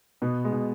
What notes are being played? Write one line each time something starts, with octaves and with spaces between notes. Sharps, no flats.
B2 B3
G#3
B2